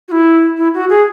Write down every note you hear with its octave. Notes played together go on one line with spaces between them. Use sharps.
F#4
E4
E4
F#4
G#4